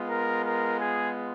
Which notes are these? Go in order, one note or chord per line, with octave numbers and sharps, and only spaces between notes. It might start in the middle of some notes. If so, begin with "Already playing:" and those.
Already playing: G#3 B3 F4
A#4
A#4
G#4